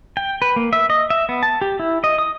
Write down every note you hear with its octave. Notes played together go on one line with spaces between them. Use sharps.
G5
B4
A#3
E5
D#5
E5
B3
A5
G4
E4
D#5
D#6